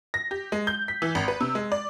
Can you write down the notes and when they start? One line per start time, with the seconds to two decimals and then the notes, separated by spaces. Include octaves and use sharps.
0.14 A#6
0.31 G4
0.52 G#3
0.67 G6
0.88 B6
1.02 E3
1.15 G#1
1.28 B4
1.41 C3
1.55 G#3
1.72 D5